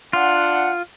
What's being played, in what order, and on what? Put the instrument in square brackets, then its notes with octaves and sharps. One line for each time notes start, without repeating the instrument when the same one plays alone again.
[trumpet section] D4 F#5 [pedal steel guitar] F4